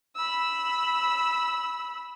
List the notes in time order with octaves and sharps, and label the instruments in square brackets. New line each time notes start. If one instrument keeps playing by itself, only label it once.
[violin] B5 E6